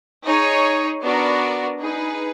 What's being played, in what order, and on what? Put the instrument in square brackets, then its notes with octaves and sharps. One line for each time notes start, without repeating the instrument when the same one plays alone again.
[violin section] D#4 G#4 C#5
B3 D4 F#4 A#4 D5
D#4 G#4 B4